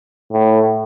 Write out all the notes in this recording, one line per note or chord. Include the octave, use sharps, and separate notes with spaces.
A2